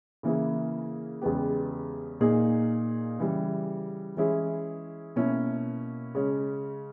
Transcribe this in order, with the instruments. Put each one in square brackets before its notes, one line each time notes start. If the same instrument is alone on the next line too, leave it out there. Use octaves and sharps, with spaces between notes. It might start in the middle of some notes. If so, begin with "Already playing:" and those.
[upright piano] C#3 E3 A#3 E4 G#4
E2 C#3 G#3 B3 G4
A#2 A#3 D#4 G#4
C#3 E3 G3
E3 G#3 C#4 E4 G#4
B2 A#3 C#4 E4
C#3 G#3 C#4